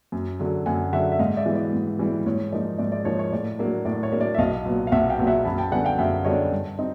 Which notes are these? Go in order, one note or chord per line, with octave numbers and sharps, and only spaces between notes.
F#2
D3 F#3
F#2 F#5 G#5
D3 F#3 E5 F#5
E5
G#2 D#5 F5
D5 E5
E3 G3 B3
D5
G#2
E3 G3 B3
G#2 C#5
F3 A#3 D#4 D5
G#2 D5
D5
F3 A#3 D#4 C#5
C#5
A2 D5
F#3 A#3 D4
A2 D5
C#5
F#3 A#3 D4
D5
E5
B1 D#5 F5
A#2 F#3 B3
F5
B1 E5 F#5
F5 G5
A#2 F#3 B3
E5 F#5
F#2 A5 B5
G5 A5
D3 G3 B3 D4 F#5 G#5
F5 G5
F#2 E5 F#5
D3 G3 B3 D4 C#5 D#5
G2
C4 D#4